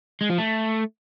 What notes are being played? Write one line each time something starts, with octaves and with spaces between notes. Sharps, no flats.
G#3
F3
A3